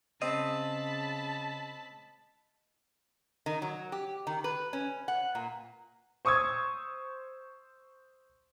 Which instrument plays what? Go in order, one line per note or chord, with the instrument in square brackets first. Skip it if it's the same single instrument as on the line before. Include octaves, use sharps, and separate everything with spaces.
[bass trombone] C#3 [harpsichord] C4 [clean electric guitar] D#5 [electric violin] A5 B5
[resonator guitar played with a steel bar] D#3
F#3
G4
D#3
B4
C#4
F#5
A#2
[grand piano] C5 C#6 D#6 E6 G#6